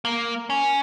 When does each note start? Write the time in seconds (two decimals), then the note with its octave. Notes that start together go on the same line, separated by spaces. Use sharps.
0.05 A#3
0.50 C#4